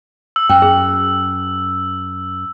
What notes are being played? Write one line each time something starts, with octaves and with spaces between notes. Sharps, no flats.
E6
F#2 G5
G#4